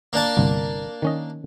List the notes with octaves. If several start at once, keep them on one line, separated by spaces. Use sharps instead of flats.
A#3 D4 A5
G1 C2
D#3 C#4 D#5